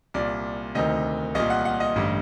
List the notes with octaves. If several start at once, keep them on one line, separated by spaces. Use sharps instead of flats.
C2 A#2 D5
D2 C3 D#3 D#5
C2 A#2 D#5
F#5
F#5
D#5
A1 G2 D3